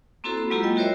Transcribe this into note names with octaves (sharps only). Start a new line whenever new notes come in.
A#3 C4 E4 F#4 A4 C5
B5
F#3 G#3 A#3 E4 F4 G4
D#5 G5
E4 F#4 A#4 C5 C#5 E5